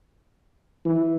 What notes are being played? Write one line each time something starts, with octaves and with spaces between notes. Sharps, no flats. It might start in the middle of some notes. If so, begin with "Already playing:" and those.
E3